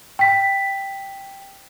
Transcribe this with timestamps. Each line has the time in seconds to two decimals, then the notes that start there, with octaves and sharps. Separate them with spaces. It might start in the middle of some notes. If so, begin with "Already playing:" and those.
0.19 G5 B6